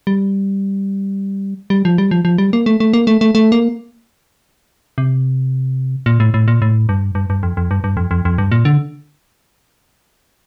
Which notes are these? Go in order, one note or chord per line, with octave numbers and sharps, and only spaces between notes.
G3
G3
F3
G3
F3
F3
G3
A#3
A3
A3
A#3
A3
A3
A3
A#3
C3
A#2
A2
A2
A#2
A2
G2
G2
G2
F2
F2
G2
G2
F2
F2
F2
G2
A#2
D3